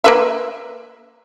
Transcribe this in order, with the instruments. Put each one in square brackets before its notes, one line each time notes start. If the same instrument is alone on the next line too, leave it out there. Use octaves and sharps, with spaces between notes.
[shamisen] A#3 B4 E5